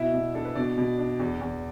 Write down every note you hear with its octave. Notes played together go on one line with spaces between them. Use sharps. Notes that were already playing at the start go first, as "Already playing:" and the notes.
Already playing: B2 E4 E5
B2
D4 A4
B4
B2 D4 D5
B2
D4
E2
E2